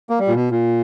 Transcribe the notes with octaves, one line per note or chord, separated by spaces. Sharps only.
A#3
G3
A#2
B2
A#2